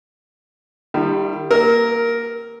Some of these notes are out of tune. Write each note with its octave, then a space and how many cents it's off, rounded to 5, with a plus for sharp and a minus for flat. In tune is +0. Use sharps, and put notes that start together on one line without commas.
D#3 -30 G3 +10 E4 +40
A#3 +0 A#4 +0 E6 -35